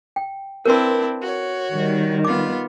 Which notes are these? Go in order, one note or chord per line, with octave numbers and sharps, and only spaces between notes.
G5
C4 D4 E4 A#4 B4 C6
F#4 C#5
D#3 G3
B3 F4 D6